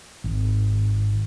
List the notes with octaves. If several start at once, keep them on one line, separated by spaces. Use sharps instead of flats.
G#1